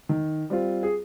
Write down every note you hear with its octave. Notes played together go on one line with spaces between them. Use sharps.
D#3
G3 C4 F4
G#4